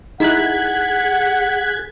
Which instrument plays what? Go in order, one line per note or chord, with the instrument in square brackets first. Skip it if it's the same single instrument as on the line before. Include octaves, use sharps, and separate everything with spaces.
[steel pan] D#4 E4 [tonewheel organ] G#4 G#6 [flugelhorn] F#5 [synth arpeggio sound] F#6 B6